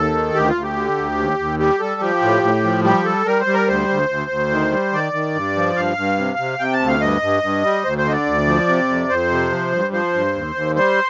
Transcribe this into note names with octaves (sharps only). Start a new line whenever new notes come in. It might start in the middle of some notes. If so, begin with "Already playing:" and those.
Already playing: D#2 A4
D#3
D2 G4
F4
D2
G4
D3
D2
D#2
D#2
G3 G4
G3 A4
F3 G4
A2
A2
F3
G3 G4
G3 A4
G3 A#4
C5
G3
A#4
D2 C5
D2
D2
D2
D#3
G3
D#3 D5
D#3
G2
F3
G2 F5
G2
C3
C3
C3 G5
A5
D2
F5
G2 D#5
G2
G2
G3
D2 C5
C5
D3 D#5
D5
D2
F3
C3
F2
F2 C5
C3
F3
G2
F3 C5
G2
D#2
D#2
G3 C5